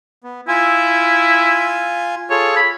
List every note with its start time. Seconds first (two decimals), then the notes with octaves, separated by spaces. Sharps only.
0.24 B3
0.48 E4 F4 G#5
2.30 F4 G#4 A4 C#5
2.56 B5